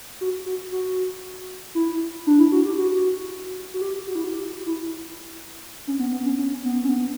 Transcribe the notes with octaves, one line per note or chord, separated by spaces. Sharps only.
F#4
F#4
F#4
E4
D4
E4
F#4
G4
F#4
F#4
G4
F#4
E4
F#4
G4
E4
C#4
B3
B3
C#4
C#4
B3
C#4
B3